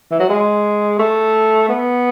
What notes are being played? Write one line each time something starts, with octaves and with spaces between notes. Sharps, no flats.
E3
F#3
G#3
A3
B3